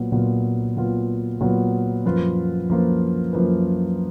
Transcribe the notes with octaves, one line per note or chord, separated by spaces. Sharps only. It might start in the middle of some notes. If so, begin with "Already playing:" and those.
Already playing: A#2 F#3 B3 F4
A#2 F#3 B3 F4
A#2 F#3 B3 F4
A#2 F#3 B3 F4
F#2 F3 A#3 F4 B4
F#2 F3 A#3 F4 B4
F#2 F3 A#3 F4 B4